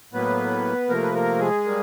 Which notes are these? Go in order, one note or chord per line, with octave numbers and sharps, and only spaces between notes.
A2 F#3 A#3 B3 B4
C3 F3 A3 A#3 A#4
B4
A#3 A#4
G#3 G#4
G3 A#3